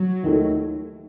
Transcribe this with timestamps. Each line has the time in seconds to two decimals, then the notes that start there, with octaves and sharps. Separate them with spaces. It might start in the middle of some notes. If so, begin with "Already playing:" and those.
Already playing: F#3
0.23 D#2 D#3 A3